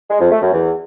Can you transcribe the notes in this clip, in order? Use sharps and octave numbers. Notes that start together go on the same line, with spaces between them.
G#3
F2
A3
F#2
E2